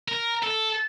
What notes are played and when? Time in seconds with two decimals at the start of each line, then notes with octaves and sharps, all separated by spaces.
0.08 A#4
0.43 A4